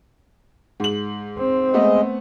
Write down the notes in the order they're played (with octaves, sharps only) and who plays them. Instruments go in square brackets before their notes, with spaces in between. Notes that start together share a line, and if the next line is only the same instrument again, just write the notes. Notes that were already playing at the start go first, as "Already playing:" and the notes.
[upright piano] G#2 F#7
[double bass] C4
[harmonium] G#3 D#5 [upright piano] A3 B3